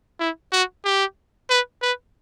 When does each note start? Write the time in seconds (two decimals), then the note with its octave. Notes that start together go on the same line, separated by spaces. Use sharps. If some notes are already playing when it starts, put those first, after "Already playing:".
0.20 E4
0.53 F#4
0.85 G4
1.50 B4
1.82 B4